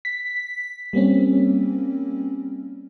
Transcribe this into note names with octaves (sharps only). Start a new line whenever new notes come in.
B6
G3 A#3 C4 C#4